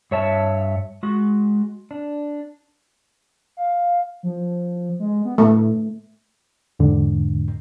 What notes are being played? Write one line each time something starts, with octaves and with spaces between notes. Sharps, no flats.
G2 C#5 E5 A5
G#3 F#4
D4
F5
F3
G#3
B3
A2 A3
E2 G#2 D3